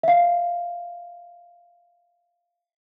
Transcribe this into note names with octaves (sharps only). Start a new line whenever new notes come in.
E5 F5